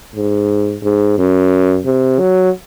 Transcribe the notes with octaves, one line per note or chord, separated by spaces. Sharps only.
G#2
G#2
F#2
C3
F#3